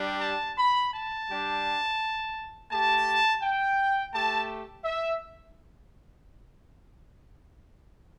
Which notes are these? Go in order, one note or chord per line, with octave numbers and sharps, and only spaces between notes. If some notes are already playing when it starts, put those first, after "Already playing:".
Already playing: G3 D4 G4
A5
B5
A5
G3 D4 G4
A3 G4 A5
G5
A3 G4 A5
E5